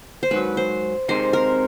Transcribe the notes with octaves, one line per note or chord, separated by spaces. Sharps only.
C5
G#2 D#3 F#3 B4
C5
C3 D#3 G#3 C4 D#4 C5
A#4